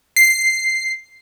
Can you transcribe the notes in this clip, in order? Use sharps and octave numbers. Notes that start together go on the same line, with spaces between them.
C7